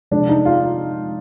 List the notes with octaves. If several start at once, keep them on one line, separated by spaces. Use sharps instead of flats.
C3 F3 G#3 D4
D#4
F4